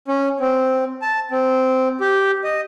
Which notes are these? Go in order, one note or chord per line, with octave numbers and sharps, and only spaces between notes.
C#4
C4
A5
C4
G4
D#5